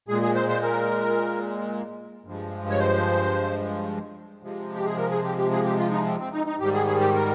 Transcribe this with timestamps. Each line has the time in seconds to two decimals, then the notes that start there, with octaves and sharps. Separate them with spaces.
0.08 A#2 G#3 G#4
0.22 G#4
0.35 C5
0.49 C5
0.63 A#4
2.25 G2 F3 G#3
2.70 C#5
2.79 C5
4.42 C3 F3 G#3
4.75 G4
4.86 G#4
4.97 A#4
5.11 G#4
5.24 G4
5.38 G4
5.52 G#4
5.65 G4
5.78 F4
5.92 D#4
6.05 C4
6.19 C4
6.33 D#4
6.46 D#4
6.60 G#2 D#3 G3 G4
6.73 G#4
6.87 G#4
7.01 G4
7.14 A#4